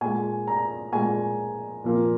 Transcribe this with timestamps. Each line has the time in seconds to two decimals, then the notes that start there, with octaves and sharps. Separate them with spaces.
0.01 A#2 G#3 G#5
0.47 A#5
0.92 A#2 G#3 G#5
1.84 A#2 F3 A#3